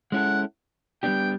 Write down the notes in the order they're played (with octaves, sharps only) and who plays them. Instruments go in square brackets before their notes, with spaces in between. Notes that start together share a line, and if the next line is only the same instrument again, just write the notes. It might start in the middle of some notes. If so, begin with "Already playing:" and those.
[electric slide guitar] G#3 C#4 E4 A4 [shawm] F#5
[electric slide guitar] G3 B3 D4 G4 [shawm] G5